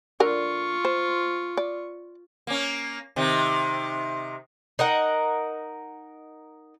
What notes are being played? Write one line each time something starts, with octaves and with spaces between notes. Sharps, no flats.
D3 F4 A#4 D5 C#6
C5
D5
A#3 C#4
C3 D#3
D#4 A#4 F#5